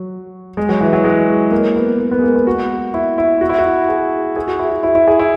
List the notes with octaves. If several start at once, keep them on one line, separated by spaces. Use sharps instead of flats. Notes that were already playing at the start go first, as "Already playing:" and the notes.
Already playing: F#3
G#3
F#3
E3
F#3
G#3
A#3
B3
A#3
B3
G#3
A#3
B3
F#4
E4
E4
F#4
E4
F#4
G#4
G#4
F#4
E4
F#4
E4
E4
G#4
E4